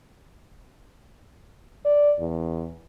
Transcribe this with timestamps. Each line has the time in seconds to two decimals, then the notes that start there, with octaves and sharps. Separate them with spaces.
1.85 D5
2.20 E2